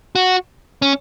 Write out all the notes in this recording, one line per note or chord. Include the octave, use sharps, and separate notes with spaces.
F#4
C#4